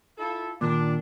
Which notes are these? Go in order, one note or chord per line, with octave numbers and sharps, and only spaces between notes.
E4 F4 A4
A#2 D#3 D4